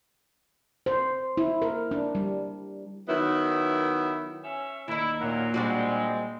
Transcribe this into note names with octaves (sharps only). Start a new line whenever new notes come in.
C5
E4
A#4
D4
G3
D#3 F#3 B3 E4
C#4 E5
D#2 D#4 E4
A#2 F#3 A#3 A#4
G3 G#3 C4 D4 F#4